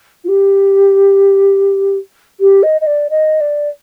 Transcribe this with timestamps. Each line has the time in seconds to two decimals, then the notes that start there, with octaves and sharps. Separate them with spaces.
0.24 F4
0.28 G4
2.40 G4
2.62 D#5
2.81 D#5
2.86 D5
3.10 D#5
3.40 D5